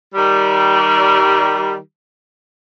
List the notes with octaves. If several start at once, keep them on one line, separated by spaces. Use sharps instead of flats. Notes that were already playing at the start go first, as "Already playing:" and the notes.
D#3 G3